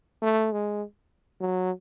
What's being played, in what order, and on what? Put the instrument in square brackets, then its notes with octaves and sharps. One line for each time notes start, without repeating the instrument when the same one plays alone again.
[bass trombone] A3
G#3
F#3